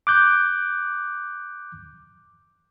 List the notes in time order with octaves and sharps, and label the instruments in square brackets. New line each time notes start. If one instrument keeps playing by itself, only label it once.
[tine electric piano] D6 F#6 G6